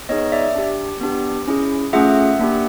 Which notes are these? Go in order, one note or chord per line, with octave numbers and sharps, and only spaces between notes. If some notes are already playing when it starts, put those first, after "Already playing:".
B3 D#4 G#4 C#5 D#5
D5 E5
D4 G4
B3 D4 G4
C#4 E4 G#4
A3 C#4 F4 G#4 E5 F#5
A#3 D4 G4